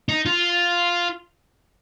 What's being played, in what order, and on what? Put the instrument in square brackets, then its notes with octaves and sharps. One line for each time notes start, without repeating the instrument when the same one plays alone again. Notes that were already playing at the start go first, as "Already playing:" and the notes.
[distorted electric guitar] D#4
F4